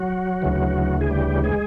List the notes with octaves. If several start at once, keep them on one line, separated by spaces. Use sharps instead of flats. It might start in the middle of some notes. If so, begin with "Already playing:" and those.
Already playing: F#3 F#4
D2 C#3 E3
G#4
G3 G4
G#3 G#4